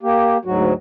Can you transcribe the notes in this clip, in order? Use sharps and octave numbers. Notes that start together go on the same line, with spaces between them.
A#3 G4
D2 G#2 F#3 F#4